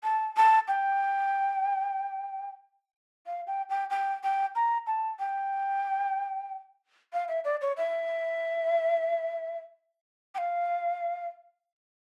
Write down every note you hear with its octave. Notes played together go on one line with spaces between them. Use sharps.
A5
A5
G5
F5
G5
G5
G5
G5
A#5
A5
G5
F5
E5
D5
C#5
E5
G5
F5